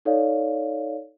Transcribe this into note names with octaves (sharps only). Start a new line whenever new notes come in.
D#4 A4 C#5 D5 F5